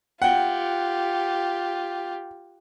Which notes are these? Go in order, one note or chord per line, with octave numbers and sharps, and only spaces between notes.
F4 G4 F#5 G5